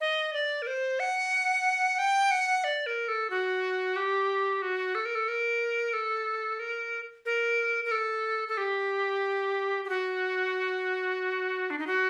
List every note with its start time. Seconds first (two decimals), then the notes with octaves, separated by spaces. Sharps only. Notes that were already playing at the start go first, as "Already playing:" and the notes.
0.01 D#5
0.33 D5
0.62 A#4
0.67 C5
1.00 F#5
1.99 G5
2.31 F#5
2.64 D5
2.86 A#4
3.08 A4
3.30 F#4
3.96 G4
4.62 F#4
4.95 A4
5.05 A#4
5.15 A4
5.28 A#4
5.93 A4
6.59 A#4
7.25 A#4
7.85 A#4
7.91 A4
8.48 A4
8.58 G4
9.85 G4
9.89 F#4
11.70 D4
11.79 D#4
11.87 F#4